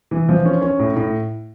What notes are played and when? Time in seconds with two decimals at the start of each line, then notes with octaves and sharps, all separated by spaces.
0.11 E3
0.29 F3
0.45 C#4
0.61 C#4
0.79 A2
0.96 A2